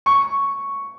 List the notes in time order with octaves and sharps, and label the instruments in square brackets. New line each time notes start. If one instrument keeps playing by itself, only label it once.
[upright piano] C#6